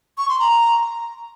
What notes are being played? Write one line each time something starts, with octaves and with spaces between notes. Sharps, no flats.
C#6
C6
A#5